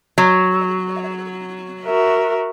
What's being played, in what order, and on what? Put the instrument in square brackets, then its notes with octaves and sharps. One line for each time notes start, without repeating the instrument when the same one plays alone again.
[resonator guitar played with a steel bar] F#3
[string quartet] F#4 A#4 E5